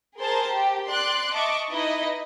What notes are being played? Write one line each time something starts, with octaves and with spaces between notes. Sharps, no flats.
G#4 A#4 C5 A5
G4
D5 C6 D6 F#6
D#5 E5 A5 C#6 D6
D#4 E4 B4 D#5